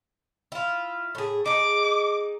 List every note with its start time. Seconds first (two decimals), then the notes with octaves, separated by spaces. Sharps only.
0.52 E4 F4
1.15 A2 G#4
1.46 D#4 G#4 D6